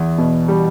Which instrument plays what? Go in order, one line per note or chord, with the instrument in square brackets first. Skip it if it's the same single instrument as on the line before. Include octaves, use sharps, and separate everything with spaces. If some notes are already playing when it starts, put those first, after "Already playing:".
Already playing: [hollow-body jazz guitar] E2
[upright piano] B2
G3